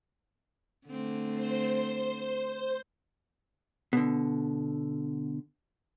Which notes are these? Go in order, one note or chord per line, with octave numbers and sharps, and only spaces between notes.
D3 A3 C4
C5
B2 D3